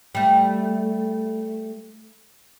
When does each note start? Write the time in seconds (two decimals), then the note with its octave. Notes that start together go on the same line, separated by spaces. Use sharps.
0.15 G3 A3